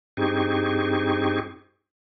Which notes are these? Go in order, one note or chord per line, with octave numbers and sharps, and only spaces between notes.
G2 C4 D#4 G4 G#4 C#6